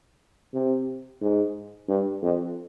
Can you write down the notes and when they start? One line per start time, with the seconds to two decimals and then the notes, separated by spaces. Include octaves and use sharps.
0.54 C3
1.21 G#2
1.89 G2
2.22 F2